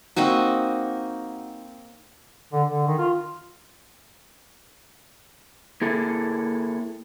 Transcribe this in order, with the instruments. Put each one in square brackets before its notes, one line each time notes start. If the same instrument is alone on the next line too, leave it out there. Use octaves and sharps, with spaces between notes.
[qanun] A#3 C4 D#4 F#4
[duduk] D3
D3
D#3
F4
[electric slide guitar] A#3 E4 G#4 A4